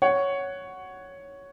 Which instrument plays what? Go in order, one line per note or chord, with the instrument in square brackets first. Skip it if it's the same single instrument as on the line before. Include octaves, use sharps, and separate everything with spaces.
[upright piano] C#5 F#5